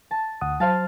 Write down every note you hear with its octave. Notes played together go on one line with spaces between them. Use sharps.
A5
D2 F#5 D#6
F#3 C5 F5 A5